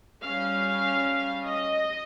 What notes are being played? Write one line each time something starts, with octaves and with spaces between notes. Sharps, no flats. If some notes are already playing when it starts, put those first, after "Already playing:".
G3 C#4 F5
D#5